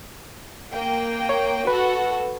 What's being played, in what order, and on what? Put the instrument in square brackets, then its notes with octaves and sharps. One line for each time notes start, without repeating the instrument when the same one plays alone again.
[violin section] A#3 G5
[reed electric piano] C#5
[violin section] F#4 A4 F#5 [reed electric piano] B4